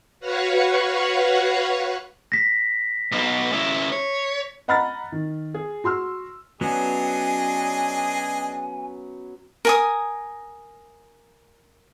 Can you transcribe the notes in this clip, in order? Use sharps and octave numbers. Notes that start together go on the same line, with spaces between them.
F#4 B4 C#5 F5 F#5 C#6
A#6 B6
B1 B2
C#3 E4
C#5
D#5 F#5 A#5 B5 F6 A6
D#3
G#4
F#4 C6 E6 F6
F#3 B3 C#4 D4 G#4 D#5 G#5
A#4 G#5 D#6